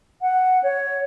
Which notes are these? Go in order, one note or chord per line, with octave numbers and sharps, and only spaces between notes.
F#5
C#5